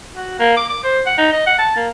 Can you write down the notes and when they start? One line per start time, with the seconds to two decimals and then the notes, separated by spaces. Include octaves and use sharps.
0.16 F#4
0.39 A#3
0.57 D6
0.69 D6
0.84 C5
1.06 F#5
1.18 D#4
1.33 D#5
1.47 F#5
1.59 A5
1.76 A#3